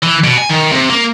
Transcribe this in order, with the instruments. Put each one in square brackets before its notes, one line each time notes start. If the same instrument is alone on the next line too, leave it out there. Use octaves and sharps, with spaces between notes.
[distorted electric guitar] E3
B2
G#5
D#3
C3
A#3